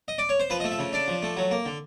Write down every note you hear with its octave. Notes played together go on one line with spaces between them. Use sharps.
D#5
D5
C#5
C5
F3 B4
D#5
A3
E5
C#3
D4 D5
F3
A3
F#3
A#3
D3